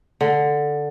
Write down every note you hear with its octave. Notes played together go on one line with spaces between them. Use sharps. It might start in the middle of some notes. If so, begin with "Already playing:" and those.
D3